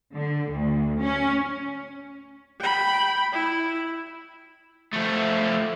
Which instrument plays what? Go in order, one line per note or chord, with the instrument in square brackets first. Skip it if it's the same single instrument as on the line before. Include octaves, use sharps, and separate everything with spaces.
[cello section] D3
D2
C#4
[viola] G5 B5
E4
[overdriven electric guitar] F3 A3